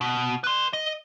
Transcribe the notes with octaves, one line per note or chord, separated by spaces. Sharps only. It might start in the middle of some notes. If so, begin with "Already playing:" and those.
B2
B4 C6
D#5